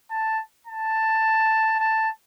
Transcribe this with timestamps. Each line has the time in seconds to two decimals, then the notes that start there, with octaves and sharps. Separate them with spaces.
0.11 A5
0.67 A5
1.80 A5